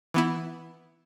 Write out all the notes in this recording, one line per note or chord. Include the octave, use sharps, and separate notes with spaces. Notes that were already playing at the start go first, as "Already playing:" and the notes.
E3 B3 E4